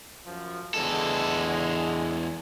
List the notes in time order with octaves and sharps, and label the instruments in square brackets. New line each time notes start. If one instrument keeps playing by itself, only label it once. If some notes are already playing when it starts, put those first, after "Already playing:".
[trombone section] F#2 F3
[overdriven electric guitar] E2 A4 [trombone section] D3 G#3